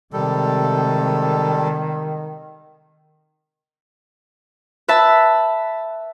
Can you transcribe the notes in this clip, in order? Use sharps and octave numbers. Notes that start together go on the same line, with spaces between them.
C3 D#3 G3 G#3 A4
B4 E5 A5 B5